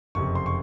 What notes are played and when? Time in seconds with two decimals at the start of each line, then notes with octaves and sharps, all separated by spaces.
0.15 F#1 F2 C3 C#6
0.35 C6
0.46 C#6